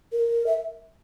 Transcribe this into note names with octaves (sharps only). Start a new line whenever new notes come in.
A#4
E5